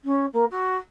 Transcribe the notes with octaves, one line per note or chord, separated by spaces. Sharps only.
C#4
A#3
F#4